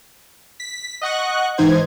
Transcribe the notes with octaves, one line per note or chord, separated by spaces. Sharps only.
B6
D#5 F#5 C#6 F#6
G#2 E3 D#4 C5 G#6